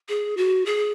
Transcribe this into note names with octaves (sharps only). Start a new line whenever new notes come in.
G#4
F#4
G#4